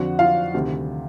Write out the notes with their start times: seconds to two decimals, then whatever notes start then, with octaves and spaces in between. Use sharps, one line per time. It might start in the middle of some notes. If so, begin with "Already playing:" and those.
Already playing: F2 D3 F3 F#4 F#5
0.19 F4 F5
0.54 D2 C3 D#3